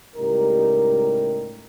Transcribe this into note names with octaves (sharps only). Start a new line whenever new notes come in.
C#2 A2 G3 D#4 G4 A#4